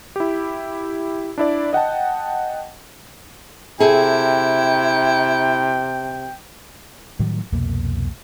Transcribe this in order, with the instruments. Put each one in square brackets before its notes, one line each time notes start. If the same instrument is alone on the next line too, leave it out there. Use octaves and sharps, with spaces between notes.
[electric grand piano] E4 G4
D4 E4 D5
D#5 F#5 G5 A5
[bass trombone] C3 [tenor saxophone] E4 [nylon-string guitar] G#4 A4 [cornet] G5
[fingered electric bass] A2 D#3 F#3 G3
C2 F2 B2 A#3